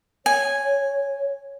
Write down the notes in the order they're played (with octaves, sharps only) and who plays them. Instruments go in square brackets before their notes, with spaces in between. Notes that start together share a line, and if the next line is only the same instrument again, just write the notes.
[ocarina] C#5 [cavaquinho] G#5